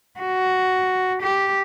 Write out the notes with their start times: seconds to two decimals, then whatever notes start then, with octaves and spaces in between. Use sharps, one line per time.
0.20 F#4
1.22 G4